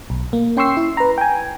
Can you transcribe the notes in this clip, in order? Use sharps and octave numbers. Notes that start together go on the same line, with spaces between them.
B1
A#3
C#4 G5 C6 C#6 E6 C7
E4
B4 A#5
G5 G#5